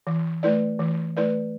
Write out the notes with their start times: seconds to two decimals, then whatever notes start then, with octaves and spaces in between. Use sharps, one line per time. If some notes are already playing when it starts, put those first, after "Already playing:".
0.07 E3
0.43 A3 E4 B4 D5
0.79 E3
1.17 A3 E4 B4 D5